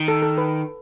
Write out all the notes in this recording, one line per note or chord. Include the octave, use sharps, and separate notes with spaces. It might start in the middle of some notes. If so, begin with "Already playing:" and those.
Already playing: D#3
A4
A4
B4